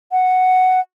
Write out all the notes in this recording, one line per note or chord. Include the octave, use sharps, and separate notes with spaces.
F#5